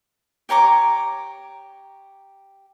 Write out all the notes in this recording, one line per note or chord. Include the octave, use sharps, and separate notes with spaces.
G4 C#5 A#5 D6